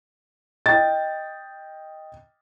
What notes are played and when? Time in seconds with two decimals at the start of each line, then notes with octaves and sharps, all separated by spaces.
0.66 D#5 G5 A6